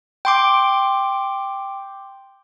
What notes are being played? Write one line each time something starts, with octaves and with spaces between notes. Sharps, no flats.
G5 C6 D6